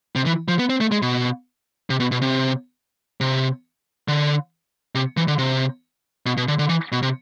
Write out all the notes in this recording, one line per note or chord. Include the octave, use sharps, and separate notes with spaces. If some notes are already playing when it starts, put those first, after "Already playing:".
C3
E3
F3
B3
C4
A3
G#3
B2
C3
B2
B2
C3
C3
D3
C3
E3
D3
C3
B2
B2
D3
D3
E3
B2
C3